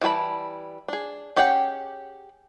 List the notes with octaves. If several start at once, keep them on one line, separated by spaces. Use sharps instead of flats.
E3 G3 F#4 A5 B5
D4 G#4
C#4 G4 G#4 F#5 G5